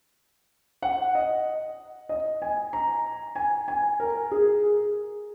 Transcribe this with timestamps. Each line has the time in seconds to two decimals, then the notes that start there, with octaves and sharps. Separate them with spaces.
0.82 F#5
1.15 D#5
2.09 D#5
2.42 G#5
2.73 A#5
3.36 G#5
3.68 G#5
4.00 A#4
4.32 G#4